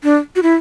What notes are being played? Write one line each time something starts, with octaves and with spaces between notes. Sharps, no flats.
D4
F#4
E4